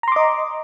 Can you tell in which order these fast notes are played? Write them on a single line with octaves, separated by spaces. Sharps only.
A#5 C6 D6 D#5